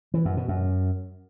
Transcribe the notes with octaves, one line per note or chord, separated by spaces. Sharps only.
E3
F#2
B2
F#2